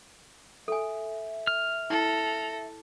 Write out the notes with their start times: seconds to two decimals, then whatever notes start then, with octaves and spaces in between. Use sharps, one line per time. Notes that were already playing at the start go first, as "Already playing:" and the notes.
0.68 A4 E5 G#5
1.47 F6
1.90 E4 A4 A#6